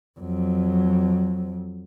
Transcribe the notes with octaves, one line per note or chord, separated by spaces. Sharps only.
F2 F#3